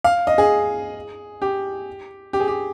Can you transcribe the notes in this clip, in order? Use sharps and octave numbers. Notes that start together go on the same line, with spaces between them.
F5
D#5
G#4
G4
G4
G#4
G4